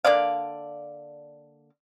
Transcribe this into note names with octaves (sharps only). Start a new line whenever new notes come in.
D3 A#3 D5 F5